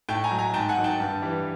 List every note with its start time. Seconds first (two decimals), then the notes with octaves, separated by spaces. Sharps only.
0.09 A2 G5 A5
0.24 G#5 A#5
0.31 F#3
0.39 G#5 A#5
0.54 G#2 G5 A5
0.69 F#5 G#5
0.77 D#3 F#3
0.84 G5 A5
1.00 G2
1.22 E3 G3